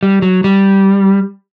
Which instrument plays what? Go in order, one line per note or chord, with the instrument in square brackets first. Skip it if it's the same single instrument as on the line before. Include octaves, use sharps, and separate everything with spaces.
[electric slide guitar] G3
F#3
G3